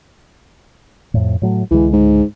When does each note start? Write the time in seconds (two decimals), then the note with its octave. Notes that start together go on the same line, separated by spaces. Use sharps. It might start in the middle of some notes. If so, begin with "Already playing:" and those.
1.14 F2 A2
1.42 A2 F#3 A3
1.71 C#2 D3 E3 G#3
1.93 G#2